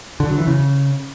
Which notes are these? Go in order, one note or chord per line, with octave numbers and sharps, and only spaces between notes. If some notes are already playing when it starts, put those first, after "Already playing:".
D3
F#3
E3
C#3